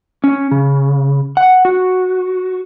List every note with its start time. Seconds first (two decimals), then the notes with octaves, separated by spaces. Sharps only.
0.24 C#4
0.51 C#3
1.37 F#5
1.65 F#4